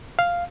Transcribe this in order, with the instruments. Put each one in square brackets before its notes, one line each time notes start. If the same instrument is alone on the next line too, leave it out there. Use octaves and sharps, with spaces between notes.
[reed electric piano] F5